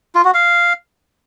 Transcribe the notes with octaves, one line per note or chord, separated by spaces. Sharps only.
F4
F#4
F5